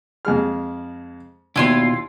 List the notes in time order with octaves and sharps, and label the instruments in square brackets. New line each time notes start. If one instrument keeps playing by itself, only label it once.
[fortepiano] F2 G#3 F6
[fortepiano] D#2 [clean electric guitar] B2 D4 [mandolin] E4 F4 C6